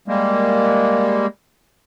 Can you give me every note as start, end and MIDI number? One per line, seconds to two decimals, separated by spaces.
0.08 1.27 55
0.08 1.27 56
0.08 1.27 58